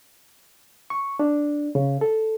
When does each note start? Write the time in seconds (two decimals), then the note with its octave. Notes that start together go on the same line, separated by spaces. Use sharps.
0.90 C#6
1.19 D4
1.75 C#3
2.01 A4